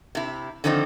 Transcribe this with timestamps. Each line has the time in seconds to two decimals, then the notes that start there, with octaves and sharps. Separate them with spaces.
0.15 C3 E4
0.64 D3 D#3 F3 C4 D#4